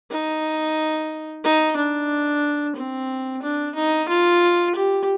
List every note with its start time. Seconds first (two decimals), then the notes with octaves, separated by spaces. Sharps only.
0.11 D#4
1.44 D#4
1.77 D4
2.76 C4
3.43 D4
3.75 D#4
4.09 F4
4.75 G4